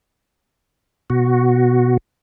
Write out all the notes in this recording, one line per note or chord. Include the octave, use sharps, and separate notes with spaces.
B2 F#4